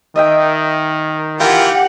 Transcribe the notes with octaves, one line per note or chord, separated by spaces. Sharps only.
D#3 D#5 E5 G5
E3 F4 G4 A#4 F#5 G5